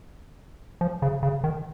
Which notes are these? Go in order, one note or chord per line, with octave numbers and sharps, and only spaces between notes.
F3
C#3
C#3
D#3